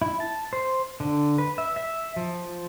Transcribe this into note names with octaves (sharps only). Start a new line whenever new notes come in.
E4
A5
C5
D3
B4
E5
E5
F3